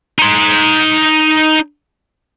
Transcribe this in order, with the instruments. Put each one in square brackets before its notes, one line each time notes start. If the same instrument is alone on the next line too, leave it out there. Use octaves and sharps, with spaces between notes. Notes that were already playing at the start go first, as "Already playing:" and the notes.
[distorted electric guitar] D#4 C6